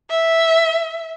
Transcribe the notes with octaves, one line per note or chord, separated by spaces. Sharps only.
E5